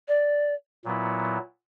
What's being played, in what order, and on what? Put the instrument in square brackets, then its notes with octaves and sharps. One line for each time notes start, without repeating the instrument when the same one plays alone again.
[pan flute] D5
[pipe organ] A#2 F#3 B3 E4